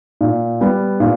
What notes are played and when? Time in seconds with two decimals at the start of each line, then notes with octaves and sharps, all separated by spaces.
0.21 A#2
0.61 G3 B3
1.00 A#2